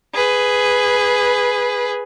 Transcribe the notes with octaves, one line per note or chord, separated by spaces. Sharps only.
G#4 B4